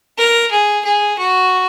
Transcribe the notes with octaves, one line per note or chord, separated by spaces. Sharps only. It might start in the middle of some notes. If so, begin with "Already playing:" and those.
A#4
G#4
G#4
F#4